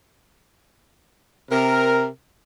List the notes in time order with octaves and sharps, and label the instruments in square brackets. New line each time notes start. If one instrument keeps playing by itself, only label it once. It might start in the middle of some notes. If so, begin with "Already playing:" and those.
[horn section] C3 A#4